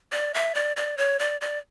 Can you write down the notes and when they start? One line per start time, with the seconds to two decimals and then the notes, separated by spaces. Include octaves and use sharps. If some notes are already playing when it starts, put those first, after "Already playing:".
0.12 D5
0.34 E5
0.55 D5
0.77 D5
0.98 C#5
1.19 D5
1.41 D5